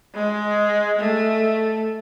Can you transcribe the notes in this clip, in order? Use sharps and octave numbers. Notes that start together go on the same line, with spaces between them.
G#3
A3